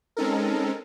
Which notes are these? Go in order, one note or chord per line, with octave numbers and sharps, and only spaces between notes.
G#3 C4 C#4 D#4 A4 A#4